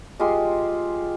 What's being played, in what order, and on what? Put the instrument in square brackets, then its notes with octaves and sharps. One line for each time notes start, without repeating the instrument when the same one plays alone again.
[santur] G#3 F4 G4 C6